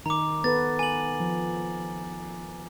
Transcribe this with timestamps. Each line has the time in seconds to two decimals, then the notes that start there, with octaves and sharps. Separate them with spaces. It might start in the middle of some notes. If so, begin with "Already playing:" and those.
0.06 D#3 D#4 A#5 D6
0.44 B3 A4 B4 A6
0.79 G#5 F#7
1.20 F3